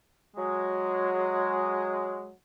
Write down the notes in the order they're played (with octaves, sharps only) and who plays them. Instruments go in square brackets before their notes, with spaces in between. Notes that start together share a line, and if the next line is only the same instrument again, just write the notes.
[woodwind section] F#3 G#3